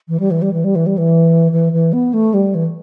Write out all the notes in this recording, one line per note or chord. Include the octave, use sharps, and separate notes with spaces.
E3
G3
E3
G3
E3
G3
E3
G3
E3
E3
E3
B3
A3
G3
E3